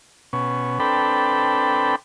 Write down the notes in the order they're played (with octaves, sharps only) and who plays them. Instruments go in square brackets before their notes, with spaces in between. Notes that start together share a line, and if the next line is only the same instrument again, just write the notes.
[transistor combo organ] B2 C#4
C4 D4 A4 B4 G5 B5